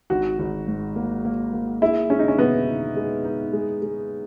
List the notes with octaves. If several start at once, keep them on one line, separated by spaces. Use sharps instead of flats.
G#1 F#4
G#1
G#2
A#3
A#3
A#3
G#3 E4
G#3 C#4
D#4
C#4
B2 B3
D#4
G#3
D#4
G#3
G#3